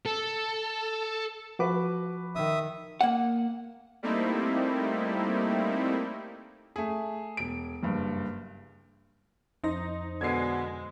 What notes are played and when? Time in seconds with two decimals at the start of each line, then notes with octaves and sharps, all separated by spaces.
0.06 A4
1.59 F3 F#4 B4 D6
2.35 D#3 E5 D#6
3.01 A#3 F#5
4.03 G3 A3 A#3 C4 D#4 E4
6.76 A3 G#4
7.37 E1 D7
7.83 F#1 G2
9.63 F2 D#4 C5 A#6
10.21 B2 D3 G#3 G#6 C7